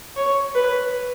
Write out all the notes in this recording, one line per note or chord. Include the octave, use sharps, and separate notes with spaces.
C#5
B4